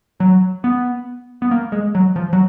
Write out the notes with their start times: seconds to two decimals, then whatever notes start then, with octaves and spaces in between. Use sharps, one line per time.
0.20 F#3
0.64 B3
1.42 B3
1.51 A#3
1.72 G#3
1.95 F#3
2.16 F3
2.33 F#3